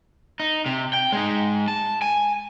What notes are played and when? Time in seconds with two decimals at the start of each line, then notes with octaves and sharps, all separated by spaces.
0.40 D#4
0.66 C3
0.93 G5
1.12 G#3 D#4
1.68 A5
2.02 G#5